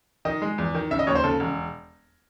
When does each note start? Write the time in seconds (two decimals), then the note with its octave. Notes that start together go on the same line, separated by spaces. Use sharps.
0.25 D#3 D#5
0.42 G#3
0.58 E2
0.75 D#3
0.91 C#3 E5
0.99 D#5
1.07 D#2 C#5
1.15 C5
1.24 C#3 A4
1.40 E1